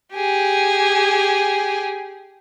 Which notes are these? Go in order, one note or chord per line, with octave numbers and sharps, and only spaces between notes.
G4 G#4